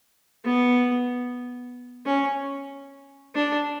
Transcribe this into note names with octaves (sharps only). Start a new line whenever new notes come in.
B3
C#4
D4